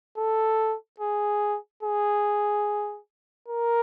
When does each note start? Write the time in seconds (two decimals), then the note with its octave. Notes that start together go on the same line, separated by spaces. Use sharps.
0.18 A4
1.00 G#4
1.83 G#4
3.48 A#4